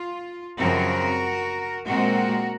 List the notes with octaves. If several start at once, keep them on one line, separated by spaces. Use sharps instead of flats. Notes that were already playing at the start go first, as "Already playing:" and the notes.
Already playing: F4
F#2 C#3 F3 C4 F#4 A#4
A#2 G#3 C4 F#4 A#4